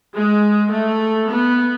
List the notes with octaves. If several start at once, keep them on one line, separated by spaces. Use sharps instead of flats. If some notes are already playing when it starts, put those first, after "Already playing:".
G#3
A3
B3